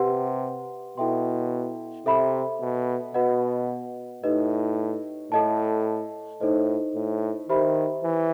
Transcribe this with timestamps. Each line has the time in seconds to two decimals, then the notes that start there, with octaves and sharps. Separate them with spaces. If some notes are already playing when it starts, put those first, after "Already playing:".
Already playing: C3 G4 B4 F#5 C6
0.98 B2 E4 A4 E5 G5 C6
2.06 C3 A4 E5 B5
2.60 B2
3.14 B2 F#4 B4 D#5 F#5
4.24 A2 D#4 G4 B4 D#5
5.32 A2 A4 D#5 A5
6.40 A2 D#4 A4 C5 D#5
6.95 A2
7.49 D#3 G4 C5 E5 B5
8.03 E3